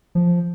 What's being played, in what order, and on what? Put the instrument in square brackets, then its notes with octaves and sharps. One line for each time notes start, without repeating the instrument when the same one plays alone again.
[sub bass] F3